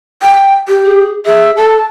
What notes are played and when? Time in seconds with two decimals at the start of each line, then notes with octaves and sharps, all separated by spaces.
0.22 G5
0.68 G4
0.85 G#4
1.26 G#4 E5
1.57 A4 A5